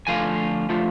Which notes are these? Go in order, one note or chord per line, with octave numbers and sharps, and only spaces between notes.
D3 F3 A3 F4 F5 G#5
D3 F3 A3 F4